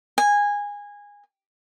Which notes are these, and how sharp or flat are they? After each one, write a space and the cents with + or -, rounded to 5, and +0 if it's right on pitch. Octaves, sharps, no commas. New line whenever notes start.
G#5 -20